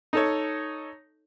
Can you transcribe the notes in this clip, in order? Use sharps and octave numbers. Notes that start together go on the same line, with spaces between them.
D#4 A4 C#5